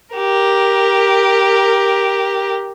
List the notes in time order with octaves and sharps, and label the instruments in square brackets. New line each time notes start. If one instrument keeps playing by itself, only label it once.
[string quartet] G4 A#4